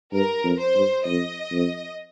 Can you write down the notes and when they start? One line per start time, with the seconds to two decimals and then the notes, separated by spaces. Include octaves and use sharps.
0.13 G2 A#4
0.44 F2
0.59 C5
0.75 G2
1.06 F2 D#5
1.52 F2